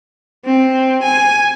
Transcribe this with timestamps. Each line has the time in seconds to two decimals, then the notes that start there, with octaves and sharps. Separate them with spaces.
0.45 C4
1.03 G#5